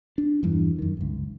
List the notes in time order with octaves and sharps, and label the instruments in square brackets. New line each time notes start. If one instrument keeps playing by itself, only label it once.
[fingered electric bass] D4
E2 G2 E3
F#2 D#3
G1 C#2